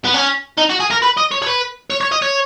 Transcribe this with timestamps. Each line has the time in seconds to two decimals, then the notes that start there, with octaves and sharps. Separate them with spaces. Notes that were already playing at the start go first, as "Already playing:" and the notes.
0.05 B3
0.14 C#4
0.58 D#4
0.70 F#4
0.80 G#4
0.91 A#4
1.02 B4
1.17 D#5
1.31 C#5
1.42 C#5
1.47 B4
1.90 C#5
2.01 C#5
2.12 D#5
2.22 C#5